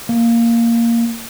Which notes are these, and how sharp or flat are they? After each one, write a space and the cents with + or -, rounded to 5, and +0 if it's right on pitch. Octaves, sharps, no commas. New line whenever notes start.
A#3 -5